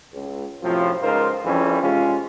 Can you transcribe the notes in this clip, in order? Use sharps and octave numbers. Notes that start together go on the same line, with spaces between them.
C#2
F#2 A2 C3 F3
C#2 D#4 F4 A#4 C5
F2 C#3 E3 G3 C#4
C3 G#3 C#4 F4